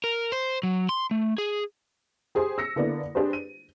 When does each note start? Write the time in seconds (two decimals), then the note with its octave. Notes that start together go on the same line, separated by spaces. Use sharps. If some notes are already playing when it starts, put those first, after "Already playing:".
0.04 A#4
0.32 C5
0.63 F#3
0.89 C6
1.11 A3
1.38 G#4
2.35 G4 G#4 C5
2.58 E6 A#6 C#7
2.76 D3 A#3 B3 E4 D5
3.15 D4 G4 G#4 B4 C5
3.33 D#7